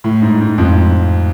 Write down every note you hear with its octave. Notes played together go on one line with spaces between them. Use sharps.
A2
G#2
G#2
F2